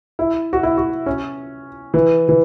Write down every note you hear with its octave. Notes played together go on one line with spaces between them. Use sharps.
E4
F#4
E4
F#4
C#4
E3
E3